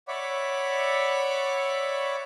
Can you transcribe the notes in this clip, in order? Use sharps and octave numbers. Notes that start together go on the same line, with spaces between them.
C#5 D5 E5 F#5 B5 D6